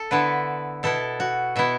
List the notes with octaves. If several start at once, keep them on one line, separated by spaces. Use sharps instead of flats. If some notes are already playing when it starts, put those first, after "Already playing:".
Already playing: A4
D3 B3 E4 B4
B2 B3 E4 A4
F#4
B2 B3 E4 E5